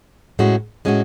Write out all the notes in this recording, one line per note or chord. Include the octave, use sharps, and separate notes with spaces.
A2 G#3 C#4 F#4
A2 G#3 C#4 F#4